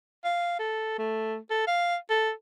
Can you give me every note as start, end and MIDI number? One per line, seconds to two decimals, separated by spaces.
0.24 0.57 77
0.59 0.98 69
0.98 1.37 57
1.50 1.67 69
1.67 1.96 77
2.10 2.32 69